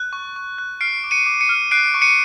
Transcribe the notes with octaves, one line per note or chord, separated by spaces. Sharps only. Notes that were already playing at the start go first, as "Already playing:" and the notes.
Already playing: F#6
C#6
C#6
F#6
F6 C7 D7
D6
C#7 D#7
D6
C#7 D#7
F6
F#6 C7 D7
C#6
C#7 D#7